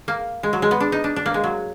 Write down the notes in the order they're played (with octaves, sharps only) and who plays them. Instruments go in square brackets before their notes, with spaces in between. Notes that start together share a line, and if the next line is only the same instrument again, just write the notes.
[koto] A#3
G#3
F#3
G#3
B3
D4
D#4
D4
D4
A#3
G#3
F#3